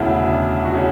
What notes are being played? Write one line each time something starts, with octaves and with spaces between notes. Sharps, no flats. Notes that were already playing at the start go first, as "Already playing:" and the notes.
Already playing: E1 D2 C#3 E4
D4
F#4
C#3 E4